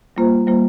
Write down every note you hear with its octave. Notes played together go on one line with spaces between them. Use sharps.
G3 A#3 F4 C5
G3 A#3 F4 C5